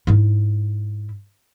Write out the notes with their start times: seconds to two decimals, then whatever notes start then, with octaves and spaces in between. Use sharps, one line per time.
0.07 G#2 E4